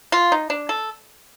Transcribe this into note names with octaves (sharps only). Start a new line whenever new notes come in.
F4
D#4
D4
A4